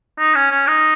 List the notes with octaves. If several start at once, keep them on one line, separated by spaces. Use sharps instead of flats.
D#4
C#4
C#4
D#4